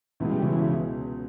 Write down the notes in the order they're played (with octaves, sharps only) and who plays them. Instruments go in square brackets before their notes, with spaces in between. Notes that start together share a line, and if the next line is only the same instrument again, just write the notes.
[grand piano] C#2 B2 G#3 [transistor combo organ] E3
[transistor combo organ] G3
C#3 E3